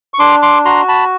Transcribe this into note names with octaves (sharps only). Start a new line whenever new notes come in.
C#6
D4 C6 D6
C6 D6
F#4 A#5 C6
A5 B5